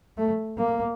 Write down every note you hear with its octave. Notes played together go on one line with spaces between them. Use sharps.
A3
A#3